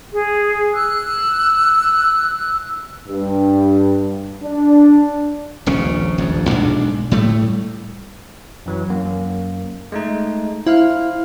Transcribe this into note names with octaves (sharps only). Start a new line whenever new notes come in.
G#4
E6 F#6
G2
D4
D#1 A#1 C#3 C#4
D#1 A#1 F2
B1 G#2 D4
A2 G3 A3
F#2 E3 F#3
F#2 A#3
G#3 A3 D#4
E4 C5 F5 F6